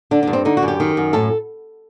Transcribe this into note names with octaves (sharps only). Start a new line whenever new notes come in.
D3 D4
D4
G2
C4
D3 D#4
F#4
F#2
G4
D#3
F#2
A2 A4